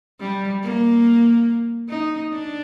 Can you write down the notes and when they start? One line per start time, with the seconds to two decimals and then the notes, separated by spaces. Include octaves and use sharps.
0.20 G3
0.63 A#3
1.89 D#4
2.32 D4